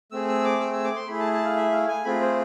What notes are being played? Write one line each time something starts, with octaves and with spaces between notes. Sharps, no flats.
A3 C4 G#4 E6
E6
D6
E6
E6
D6
C6
A3 E4 G#4 B5
A5
A5
F5
E5
F5
G#5
A3 C4 F4 G#4 B5
C5